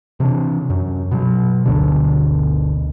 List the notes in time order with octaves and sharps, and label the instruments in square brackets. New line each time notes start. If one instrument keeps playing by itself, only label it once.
[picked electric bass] C3 E3 C4 D4
F#2
B2 F#3
G1 D2 B2 D3